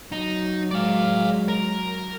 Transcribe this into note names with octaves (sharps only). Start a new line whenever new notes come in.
F#3 D#4
G#3 D5 F5
A#4